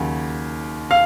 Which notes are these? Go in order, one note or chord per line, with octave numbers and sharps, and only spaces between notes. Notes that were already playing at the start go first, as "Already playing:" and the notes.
Already playing: D#2 C#3 F#3
F5